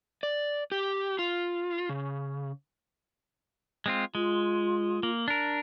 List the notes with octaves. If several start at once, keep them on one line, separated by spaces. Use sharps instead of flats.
D5
G4
F4
C#3
G#3 C4 F4
G#3 F4
A#3
D4 A#4